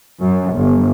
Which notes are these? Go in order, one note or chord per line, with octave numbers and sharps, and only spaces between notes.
F#2
G1